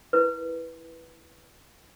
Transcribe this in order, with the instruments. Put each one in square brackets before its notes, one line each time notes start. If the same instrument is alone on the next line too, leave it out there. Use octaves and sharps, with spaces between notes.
[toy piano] E4 A#4 B4